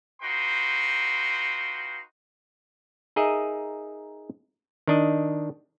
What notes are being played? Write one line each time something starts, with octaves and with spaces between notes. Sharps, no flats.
D#4 F4 F#4 B4 G5 C6
D#4 G#4 A#4 D#5 E5
D#3 D4 D#5